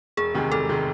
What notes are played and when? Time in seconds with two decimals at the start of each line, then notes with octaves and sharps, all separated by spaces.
0.17 E1 G#4
0.34 D2 C3 D#3 G#3
0.52 E1 A4
0.69 C3 D#3 G#3